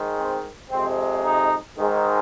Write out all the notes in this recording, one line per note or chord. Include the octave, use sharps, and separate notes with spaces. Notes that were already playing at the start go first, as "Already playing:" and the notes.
Already playing: G#2 D#3 G#3
C4
F2 C3 G#3 C4
D#4
G#2 D#3 G#3